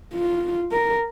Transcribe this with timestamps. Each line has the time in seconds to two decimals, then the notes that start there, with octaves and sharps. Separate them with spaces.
0.15 F4
0.72 A#4